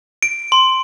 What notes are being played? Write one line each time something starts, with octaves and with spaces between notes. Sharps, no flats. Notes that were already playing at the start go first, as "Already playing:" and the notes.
D7
C6